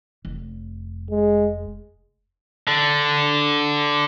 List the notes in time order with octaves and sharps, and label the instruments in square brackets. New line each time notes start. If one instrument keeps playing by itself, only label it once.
[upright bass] F1
[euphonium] G#3
[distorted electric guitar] D3